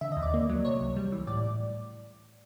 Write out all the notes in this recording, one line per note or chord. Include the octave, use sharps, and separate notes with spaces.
D3 E5
D#5
D#2
D5
A#3
F#3
C3 C#5
C#2
G3
E3
A2 D5